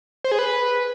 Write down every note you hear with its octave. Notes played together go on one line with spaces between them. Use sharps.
C5
G#4
B4